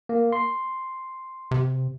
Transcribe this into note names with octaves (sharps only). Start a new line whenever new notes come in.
A#3
C6
C3